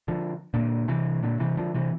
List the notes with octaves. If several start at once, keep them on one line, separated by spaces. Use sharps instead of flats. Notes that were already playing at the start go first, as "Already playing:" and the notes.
D3 F3
A#2 D3
C3 E3
A#2 D3
C3 E3
D3 F3
C3 E3